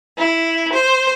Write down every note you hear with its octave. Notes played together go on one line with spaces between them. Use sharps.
E4
C5